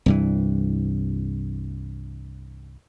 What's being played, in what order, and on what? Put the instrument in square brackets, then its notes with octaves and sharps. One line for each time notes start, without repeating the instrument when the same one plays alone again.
[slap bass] C2 G2 E3